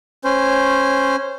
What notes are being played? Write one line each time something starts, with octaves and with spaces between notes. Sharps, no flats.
C#4 C5